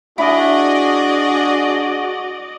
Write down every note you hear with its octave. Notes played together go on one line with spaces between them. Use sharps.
D4 E4 F#4 G#4 D5 D#5